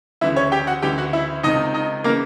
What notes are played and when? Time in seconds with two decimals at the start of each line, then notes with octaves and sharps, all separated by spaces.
0.21 D2 C#3 E3 E4 E5
0.36 C#4 C#5
0.52 G4 G5
0.67 F#4 F#5
0.82 D2 C#3 E3 G4 G5
0.98 F#4 F#5
1.13 E4 E5
1.43 C#2 C3 D#3 D#4 D#5
1.74 D#4 D#5
2.04 C#3 E3 A#3 A#4